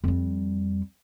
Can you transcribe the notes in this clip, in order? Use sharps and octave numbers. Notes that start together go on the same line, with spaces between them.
F2 G3